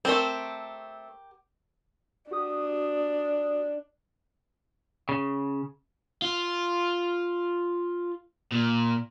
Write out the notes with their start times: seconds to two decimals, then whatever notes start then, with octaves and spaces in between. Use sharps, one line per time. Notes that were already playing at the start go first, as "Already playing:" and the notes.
0.05 A3 C4 G4 A#4 G5
2.31 D4 F#4 G4 D#6
5.09 C#3
6.22 F4
8.52 A#2